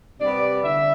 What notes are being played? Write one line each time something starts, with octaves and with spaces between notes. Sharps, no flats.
C3 G3 B3 D5
D3 E5